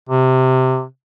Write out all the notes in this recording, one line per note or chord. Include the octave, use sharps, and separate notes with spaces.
C3